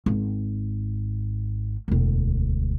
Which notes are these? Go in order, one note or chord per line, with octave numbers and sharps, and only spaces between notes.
G#1
E1 D2